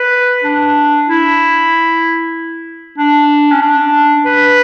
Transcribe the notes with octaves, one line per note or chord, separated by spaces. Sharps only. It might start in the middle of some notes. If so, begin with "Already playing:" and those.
Already playing: B4
D4
E4
D4
C#4
D4
B4